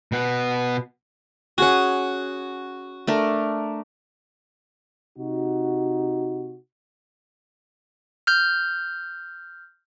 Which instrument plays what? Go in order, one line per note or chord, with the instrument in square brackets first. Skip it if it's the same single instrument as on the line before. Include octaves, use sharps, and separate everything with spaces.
[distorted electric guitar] B2 B3
[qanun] C#4 G#4 [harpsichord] F#4 F#5
[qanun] A3 D4 A#4
[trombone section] C3 D#4 F#4
[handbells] F6 G6